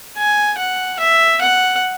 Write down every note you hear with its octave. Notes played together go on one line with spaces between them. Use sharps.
G#5
F#5
E5
F#5